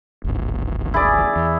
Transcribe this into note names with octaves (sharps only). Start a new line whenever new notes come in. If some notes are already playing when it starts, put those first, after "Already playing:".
D1 G#1
E4 G#4 D5
E2